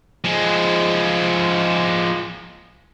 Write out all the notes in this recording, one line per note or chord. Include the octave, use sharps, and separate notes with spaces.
F3 G#3